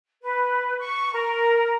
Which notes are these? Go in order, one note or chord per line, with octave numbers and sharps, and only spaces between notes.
B4
C#6
A#4